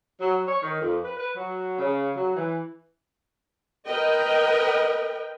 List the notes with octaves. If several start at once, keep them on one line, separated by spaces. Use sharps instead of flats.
F#3
C#5
D#3
F2
B4
B4
F#3
C#3
F#3
E3
A#4 B4 D#5 G5